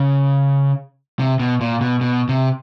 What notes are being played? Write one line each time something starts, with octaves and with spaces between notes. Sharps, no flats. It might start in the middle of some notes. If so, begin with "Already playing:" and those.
Already playing: C#3
C3
B2
A#2
B2
B2
C3